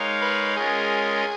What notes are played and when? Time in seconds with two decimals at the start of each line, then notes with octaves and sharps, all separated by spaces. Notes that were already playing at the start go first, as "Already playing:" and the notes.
Already playing: G#3 D#4 A#4 C#5 F5
0.21 B4
0.56 G#3 C#4 F4 G#4 A#4 D#5